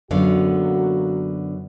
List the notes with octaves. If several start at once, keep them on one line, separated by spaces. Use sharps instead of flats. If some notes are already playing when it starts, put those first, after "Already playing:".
F#2 D3 F#3 A#3 B3 F#4 F5